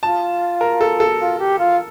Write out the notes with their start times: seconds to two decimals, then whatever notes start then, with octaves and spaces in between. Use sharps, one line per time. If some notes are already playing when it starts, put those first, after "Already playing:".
0.03 F4 A5
0.61 A#4
0.81 A4
1.00 A4
1.18 F4
1.38 G4
1.58 F4